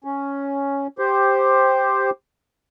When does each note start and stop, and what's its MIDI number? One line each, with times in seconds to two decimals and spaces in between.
0.04 0.87 61
0.98 2.10 67
0.98 2.10 72